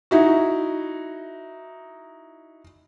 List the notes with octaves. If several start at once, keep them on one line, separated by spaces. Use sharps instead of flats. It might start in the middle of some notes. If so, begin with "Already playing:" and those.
D#4 E4 F#4